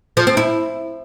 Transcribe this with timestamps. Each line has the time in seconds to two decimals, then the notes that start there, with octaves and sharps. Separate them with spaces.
0.17 F3
0.27 C4
0.37 E4